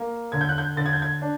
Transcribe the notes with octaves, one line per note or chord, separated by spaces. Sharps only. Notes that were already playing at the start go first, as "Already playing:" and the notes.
Already playing: A#3
D3 G#6
G6
F#6
G6
D3 A6
G#6
G6
G#6
D4